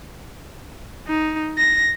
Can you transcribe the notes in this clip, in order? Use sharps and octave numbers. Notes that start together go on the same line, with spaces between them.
D#4
A#6